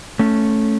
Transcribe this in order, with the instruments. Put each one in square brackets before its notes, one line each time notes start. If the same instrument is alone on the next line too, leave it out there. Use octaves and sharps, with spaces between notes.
[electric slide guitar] A3 C#4